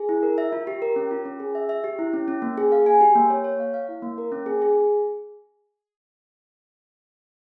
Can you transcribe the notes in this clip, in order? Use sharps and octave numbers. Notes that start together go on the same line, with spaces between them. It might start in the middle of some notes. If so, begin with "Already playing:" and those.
Already playing: G#4
E4
A#4
E5
F4
G4
A#4
C#4
F4
C#4
G#4
E5
E5
G4
E4
C#4
C#4
A#3
G#4
F5
G#5
G4
A#3
C#5
C#5
F5
F5
E4
A#3
A#4
C#4
G#4
G#4